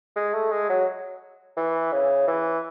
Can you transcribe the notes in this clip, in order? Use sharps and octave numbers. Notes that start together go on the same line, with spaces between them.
G#3
A3
G#3
F#3
E3
C#3
E3